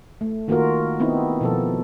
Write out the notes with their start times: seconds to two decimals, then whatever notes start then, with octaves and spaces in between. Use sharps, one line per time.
0.21 A3
0.48 D#3 A#3 F4 F#4 A#4
1.00 B3 C4 D#4 E4
1.41 B2 F3 A4